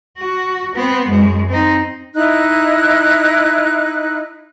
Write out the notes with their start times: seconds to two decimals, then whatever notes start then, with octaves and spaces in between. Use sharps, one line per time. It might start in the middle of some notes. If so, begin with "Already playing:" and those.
0.18 F#4
0.75 B3 C4
1.09 F#2 G#3
1.50 C4 D#4
2.15 D#4 E4 F#6